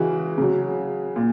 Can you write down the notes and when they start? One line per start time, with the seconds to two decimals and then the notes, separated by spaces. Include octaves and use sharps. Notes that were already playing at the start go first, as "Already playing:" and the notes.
Already playing: C#3 E3 G#3 F#4
0.38 C#3 F#3
1.16 A#2